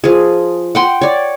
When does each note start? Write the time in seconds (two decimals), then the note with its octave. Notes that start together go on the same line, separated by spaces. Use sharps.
0.04 F3 G#4
0.75 F#5 G5 C6
1.01 C#5 D5